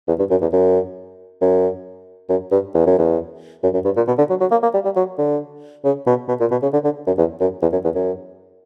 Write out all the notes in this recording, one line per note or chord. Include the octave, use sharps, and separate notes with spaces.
E2
G2
F#2
E2
F#2
F#2
F#2
G2
E2
F#2
E2
F#2
F#2
G2
A#2
B2
D3
F#3
F#3
A#3
A#3
G3
G3
F#3
D3
C#3
B2
B2
A#2
B2
C#3
D3
D3
F#2
E2
F#2
E2
F#2
E2
F#2